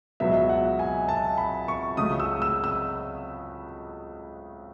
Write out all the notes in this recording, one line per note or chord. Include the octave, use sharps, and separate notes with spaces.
C#2 B2 F#3 B3 E5
F#5
G#5
A5
B5
C#6
C#2 C#3 F#3 A3 D#6
E6
E6
E6